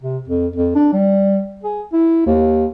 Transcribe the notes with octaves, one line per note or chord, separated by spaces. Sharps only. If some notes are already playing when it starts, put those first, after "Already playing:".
C3
F2
F2
D4
G3
G#4
E4
D#2